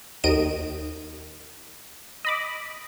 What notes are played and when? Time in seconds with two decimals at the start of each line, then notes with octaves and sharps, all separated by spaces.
0.24 D#2 D#3 D#5 D7 D#7
2.25 D#5 B5 D6